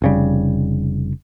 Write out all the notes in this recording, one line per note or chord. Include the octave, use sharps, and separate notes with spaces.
F1 C#3 G3